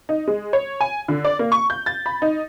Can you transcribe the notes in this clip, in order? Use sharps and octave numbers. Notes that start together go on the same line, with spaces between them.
D#4
G#3
C#5
G#5
D3
D5
A#3
C#6
G6
A6
B5
D#4